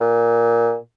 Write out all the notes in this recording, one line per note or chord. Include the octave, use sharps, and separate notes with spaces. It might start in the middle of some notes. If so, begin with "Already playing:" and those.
A#2